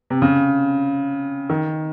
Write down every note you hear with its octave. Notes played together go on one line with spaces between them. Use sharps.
C3
C#3
D#3